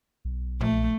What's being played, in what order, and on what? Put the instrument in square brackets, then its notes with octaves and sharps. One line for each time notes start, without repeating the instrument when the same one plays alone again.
[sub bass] B1
[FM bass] A#1 [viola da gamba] A3